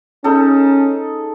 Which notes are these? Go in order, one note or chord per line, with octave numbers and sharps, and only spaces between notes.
C#4 D#4 G#4 A4